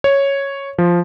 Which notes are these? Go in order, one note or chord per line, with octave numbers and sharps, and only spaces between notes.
C#5
F3